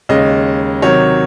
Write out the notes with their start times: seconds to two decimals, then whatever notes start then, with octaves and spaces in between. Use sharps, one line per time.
0.09 D#2 C#3 G#3 C#4 D#5
0.82 C3 D#3 F#3 C#5